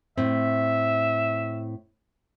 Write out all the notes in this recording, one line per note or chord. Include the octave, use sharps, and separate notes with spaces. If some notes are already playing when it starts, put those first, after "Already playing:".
A2 C4 E5